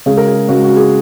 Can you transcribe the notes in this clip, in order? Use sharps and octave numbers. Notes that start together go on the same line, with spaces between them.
C#3 G#3 G#4
A#4
G#4
C#3 G#3 F#4
F#4
G#4